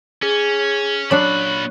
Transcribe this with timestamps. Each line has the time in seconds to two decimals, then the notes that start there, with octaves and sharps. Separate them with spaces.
0.23 C#4 G#4
1.11 A#2 F#3 D4 B5 C#6 F#6 C7